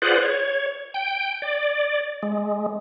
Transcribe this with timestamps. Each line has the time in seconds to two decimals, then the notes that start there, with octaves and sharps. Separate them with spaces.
0.02 F4 G#4 B4 C5 D5 F#5
0.22 C#5
0.94 G5
1.42 D5
2.23 G#3